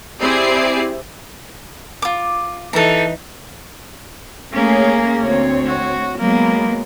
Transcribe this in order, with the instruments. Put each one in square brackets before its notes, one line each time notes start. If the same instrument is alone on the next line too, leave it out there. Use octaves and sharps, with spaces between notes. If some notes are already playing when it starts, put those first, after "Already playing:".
[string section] C4 E4 G4 G#4 D5 C7
[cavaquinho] F4 D6
[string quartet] E3 D#4 [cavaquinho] A4 A#5
[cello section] A3 C#4 G#4 [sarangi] A#3
[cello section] D2 C4 C#5
[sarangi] F#4
[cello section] F#3 G#3 B3 [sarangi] A#3